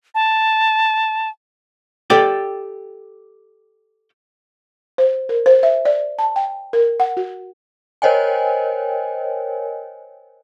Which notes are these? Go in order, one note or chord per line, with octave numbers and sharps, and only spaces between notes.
A5
G4 A4 D5 G5
C5
A#4
C5
E5
D5
A5
G5
A#4
F#5
F#4
A#4 C5 C#5 D#5 G5 G#5